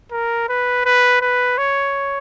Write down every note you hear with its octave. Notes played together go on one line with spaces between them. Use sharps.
A#4
B4
B4
B4
C#5